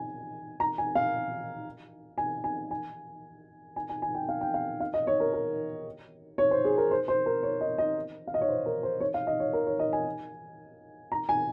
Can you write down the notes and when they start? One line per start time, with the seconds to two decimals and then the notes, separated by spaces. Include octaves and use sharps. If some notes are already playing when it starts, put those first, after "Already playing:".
Already playing: G#5
0.60 A#5
0.78 G#5
0.95 F5
2.18 G#5
2.44 G#5
2.71 G#5
3.76 G#5
3.89 G#5
4.02 G#5
4.15 G5
4.29 F5
4.41 G5
4.54 F5
4.80 F5
4.94 D#5
5.07 C#5
5.20 A#4
5.33 A#4
6.38 C#5
6.51 C5
6.64 G#4
6.78 A#4
6.91 C5
7.08 C5
7.26 A#4
7.43 C#5
7.61 D#5
7.78 D#5
8.27 F5
8.34 D#5
8.41 C#5
8.49 C5
8.66 A#4
8.83 C5
9.00 C#5
9.14 F5
9.27 D#5
9.40 C#5
9.53 A#4
9.67 C#5
9.79 D#5
9.93 G#5
11.12 A#5
11.29 G#5